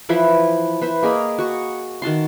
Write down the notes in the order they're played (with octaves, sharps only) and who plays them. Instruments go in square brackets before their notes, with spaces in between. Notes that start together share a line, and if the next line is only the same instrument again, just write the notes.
[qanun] E3 F3 E4 B4
B4 C5 E5
A#3 G#4 D#5 B5
F#4 C#6
D#3 F#4 A5 C6